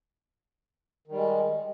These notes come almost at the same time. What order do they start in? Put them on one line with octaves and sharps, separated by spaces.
D#3 G3 G#3